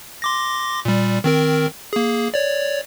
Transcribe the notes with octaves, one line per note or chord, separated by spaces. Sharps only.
C6 D6 A#6
A#2 G3
D#3 C4 A#4
A#3 G#4
C#5 D5